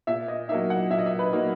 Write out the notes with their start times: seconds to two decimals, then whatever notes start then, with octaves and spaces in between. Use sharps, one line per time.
0.07 A#2 E5
0.28 D#5
0.49 F#3 A#3 D#4 E5
0.70 F#5
0.91 A#2 E5
0.99 D#5
1.06 E5
1.19 B4
1.33 F#3 A#3 D#4